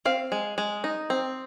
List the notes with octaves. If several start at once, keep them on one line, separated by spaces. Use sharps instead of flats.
C4 F5
G#3
G#3
D#4
C4